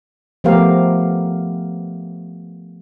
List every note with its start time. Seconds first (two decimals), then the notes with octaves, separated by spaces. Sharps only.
0.44 F3 A3 B3 G4 A#4 F5